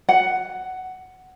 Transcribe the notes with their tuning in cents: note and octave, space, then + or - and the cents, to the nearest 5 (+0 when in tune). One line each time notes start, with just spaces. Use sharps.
F#5 +10